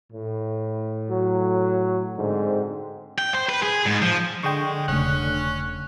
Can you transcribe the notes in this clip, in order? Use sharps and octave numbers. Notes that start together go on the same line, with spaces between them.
A2
F#3
G#2 D3 C4
G5
C5
B4
G#4
G#2
F3
D3 G#3 G5 C#6
E1 C#3 A3 C#4 F#6